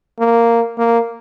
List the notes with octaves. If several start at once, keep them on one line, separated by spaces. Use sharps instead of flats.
A#3
A#3